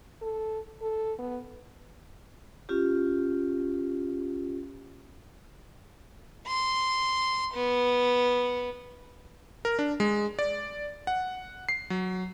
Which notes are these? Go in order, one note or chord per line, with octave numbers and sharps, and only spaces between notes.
A4
A4
B3
C#4 F4 G4
C6
B3
A#4
D4
G#3
D5
F#5
C7
F#3